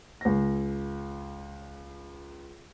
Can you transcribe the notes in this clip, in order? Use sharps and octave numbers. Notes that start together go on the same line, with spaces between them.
C#2 A#6